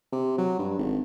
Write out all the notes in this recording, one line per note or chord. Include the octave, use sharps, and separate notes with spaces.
C3
F#3
G2
G#1